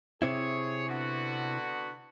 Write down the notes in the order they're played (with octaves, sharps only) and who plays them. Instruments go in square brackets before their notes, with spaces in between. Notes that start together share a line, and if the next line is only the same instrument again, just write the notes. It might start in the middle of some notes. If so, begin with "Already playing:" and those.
[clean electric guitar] C3 C4 E4 [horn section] G#4 C#5
[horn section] D3 B3 F#4